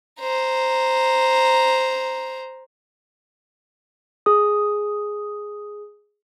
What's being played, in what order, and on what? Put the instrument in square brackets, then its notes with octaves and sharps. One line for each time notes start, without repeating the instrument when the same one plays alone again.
[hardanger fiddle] C5 A#5
[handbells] G#4 D#6